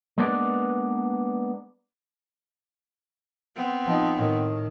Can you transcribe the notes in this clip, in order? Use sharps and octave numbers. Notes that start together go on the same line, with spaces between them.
G#3 A#3 B3 D4 B4 D5
B3 C4
F3 D#4
A2 D#3